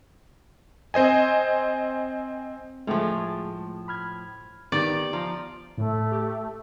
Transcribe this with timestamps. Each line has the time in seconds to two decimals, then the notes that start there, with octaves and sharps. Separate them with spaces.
0.94 C4 C5 D#5 G#5
2.87 A2 F3 G#3 A3 G#4
3.88 B5 F6 G#6
4.72 D#3 B3 G4 D5
5.13 F3 A#5
5.78 A2 A3
6.12 G4